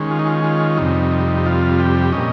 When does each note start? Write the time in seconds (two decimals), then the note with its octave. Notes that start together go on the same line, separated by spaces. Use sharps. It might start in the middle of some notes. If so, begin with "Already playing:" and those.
Already playing: D#3 G#3 C#4
0.11 F4
0.19 D#4
0.27 F4
0.44 F4
0.77 F2 C3 G3 D#4
1.46 F4
1.79 G4
2.12 A#2 G3 C#4 D#5